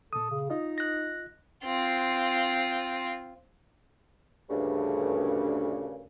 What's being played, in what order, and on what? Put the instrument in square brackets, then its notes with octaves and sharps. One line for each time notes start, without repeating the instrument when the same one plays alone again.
[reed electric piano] A#2 D#6 [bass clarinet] A4
[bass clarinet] C#3
[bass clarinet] D#4 [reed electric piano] F4 D#5
[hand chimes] F#6 A#6
[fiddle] C4 F4
[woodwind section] D2 G2 A#2 C#3